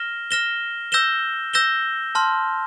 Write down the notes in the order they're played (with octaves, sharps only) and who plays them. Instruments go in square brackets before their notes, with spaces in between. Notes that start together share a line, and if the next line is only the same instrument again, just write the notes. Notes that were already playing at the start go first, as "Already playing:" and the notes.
Already playing: [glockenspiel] F6 A#6 E7 G7
F6 A#6 E7 G7
E6 G6 A#6 E7 G7
E6 G6 A#6 E7 G7
A5 C6 F6